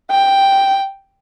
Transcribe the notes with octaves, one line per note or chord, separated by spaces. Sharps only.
G5